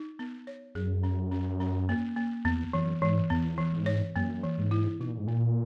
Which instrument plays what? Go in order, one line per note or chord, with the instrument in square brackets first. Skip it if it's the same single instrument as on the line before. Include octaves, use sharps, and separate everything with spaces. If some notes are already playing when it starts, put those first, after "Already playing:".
Already playing: [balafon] D#4
B3
C#5
[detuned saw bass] F#2 [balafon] G#4
[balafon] C#4
C#4
C#4
A#3
A#3
[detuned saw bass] E2 [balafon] B3
[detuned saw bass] F#2 [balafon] E3
[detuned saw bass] G#2 [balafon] E3
[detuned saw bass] E2 [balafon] B3
[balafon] E3
[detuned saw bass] G#2
[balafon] C#5
[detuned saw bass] F#2 [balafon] A#3
[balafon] E3
[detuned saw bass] G#2
[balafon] E4
[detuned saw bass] B2 [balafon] D#4
[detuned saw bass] A#2
G#2
[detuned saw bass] A#2 [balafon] A#3